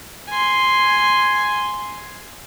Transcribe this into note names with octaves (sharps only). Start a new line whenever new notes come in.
G#5 C6